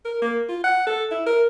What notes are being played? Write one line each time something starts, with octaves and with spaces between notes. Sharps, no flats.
A#4
A#3
F4
F#5
A4
E4
A#4